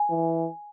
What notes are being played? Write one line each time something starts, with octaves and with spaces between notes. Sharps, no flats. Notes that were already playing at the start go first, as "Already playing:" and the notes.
Already playing: G#5
E3